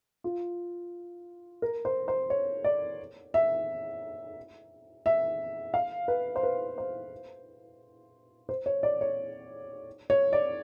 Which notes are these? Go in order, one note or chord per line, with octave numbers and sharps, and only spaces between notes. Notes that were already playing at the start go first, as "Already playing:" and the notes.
F4
A#4
C5
C5
C#5
D5
E5
E5
F5
B4
C5
B4
C5
C5
C#5
D5
C#5
C#5
D5